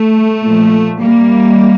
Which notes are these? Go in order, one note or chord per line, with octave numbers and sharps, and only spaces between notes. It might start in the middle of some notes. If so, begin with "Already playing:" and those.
Already playing: A3
A#2 F3
G3 A#3